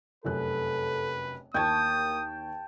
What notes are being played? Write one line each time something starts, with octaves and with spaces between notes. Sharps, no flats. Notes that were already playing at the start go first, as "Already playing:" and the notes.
F1 F#2 A4 B4 F#6
D#2 A#3 G5 A5 C#6 D#6 G#6